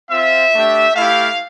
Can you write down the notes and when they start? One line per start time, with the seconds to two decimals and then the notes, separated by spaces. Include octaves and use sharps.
0.11 C4 F4 E5
0.53 A3 D4 G4
0.96 A3 E4 G4 F5